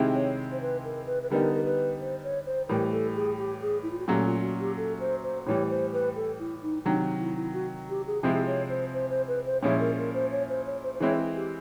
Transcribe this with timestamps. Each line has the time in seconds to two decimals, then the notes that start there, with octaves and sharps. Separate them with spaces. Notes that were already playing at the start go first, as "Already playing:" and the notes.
Already playing: C3 D#3 G#3 C4 E4
0.14 C#5
0.52 C5
0.61 B4
0.84 A#4
1.07 B4
1.23 B4
1.30 D3 G3 B3 D#4 A#4
1.54 A#4
1.65 B4
1.99 C5
2.23 C#5
2.46 C5
2.68 A2 E3 G3 A#4
2.91 A4
3.16 G#4
3.38 G4
3.61 G#4
3.83 E4
3.91 F4
3.99 F#4
4.07 A#2 F#3 A3 C#4 G4
4.25 F4
4.42 F#4
4.60 G4
4.77 A4
5.00 C5
5.23 C5
5.46 A2 E3 G3 C#5
5.70 C5
5.93 B4
6.16 A4
6.39 E4
6.62 D#4
6.85 C3 D#3 F#3 D4
7.03 D#4
7.20 E4
7.37 E4
7.54 F#4
7.89 G4
8.07 G#4
8.23 C3 F3 G#3 C4 E4 G#4
8.47 C#5
8.69 C5
8.94 C5
9.10 C5
9.28 B4
9.46 C5
9.63 A#2 F3 G#3 C#4 E4 C#5
9.79 A#4
9.98 A#4
10.14 C5
10.31 C#5
10.49 C5
10.66 C#5
10.84 C5
10.94 C5
11.00 E3 G#3 C4 E4 C#5
11.19 G#4
11.35 G4